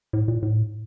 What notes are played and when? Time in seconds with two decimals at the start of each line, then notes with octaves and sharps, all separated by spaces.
0.13 A2
0.28 A#2
0.43 A2